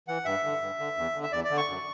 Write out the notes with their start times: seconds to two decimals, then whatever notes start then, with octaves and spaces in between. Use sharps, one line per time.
0.08 E3 F#5
0.25 G2 E5
0.44 D3
0.61 G2
0.79 D3
0.97 E2
1.16 D3
1.23 E5
1.32 E2 D5
1.44 D5
1.51 D3
1.57 C#6
1.69 F#2